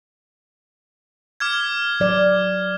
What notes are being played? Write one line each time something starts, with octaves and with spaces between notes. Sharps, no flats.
D6 F6 G#6
F#3 D5